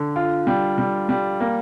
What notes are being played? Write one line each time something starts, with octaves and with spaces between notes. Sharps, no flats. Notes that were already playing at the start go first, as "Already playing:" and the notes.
Already playing: D3
F4
G3
G3
G3
A#3